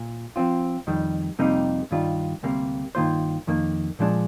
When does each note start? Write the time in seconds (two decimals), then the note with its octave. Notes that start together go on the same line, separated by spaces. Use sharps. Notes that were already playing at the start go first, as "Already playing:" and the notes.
Already playing: A#2
0.36 F3 C4 F4
0.87 F2 D#3 G3
1.39 F2 C3 G3 A#3 D#4
1.91 G2 D#3 G3 D4 F4
2.43 D2 C3 G3 A#3
2.95 G2 D#3 A#3 F4 C5
3.47 F2 D#3 A#3
3.99 A#2 F3 G#3 D4